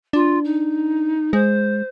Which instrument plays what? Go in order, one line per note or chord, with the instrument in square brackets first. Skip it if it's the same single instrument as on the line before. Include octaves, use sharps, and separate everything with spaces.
[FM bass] D4 [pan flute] F4
[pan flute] D#4
[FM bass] G#3 [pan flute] C5